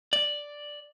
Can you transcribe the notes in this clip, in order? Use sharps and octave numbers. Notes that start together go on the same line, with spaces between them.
D5